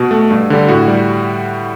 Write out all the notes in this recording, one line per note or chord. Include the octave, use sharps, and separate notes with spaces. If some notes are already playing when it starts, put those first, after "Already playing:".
Already playing: B2 F#4
A3
G2
D3 G3
A2 F#4
G3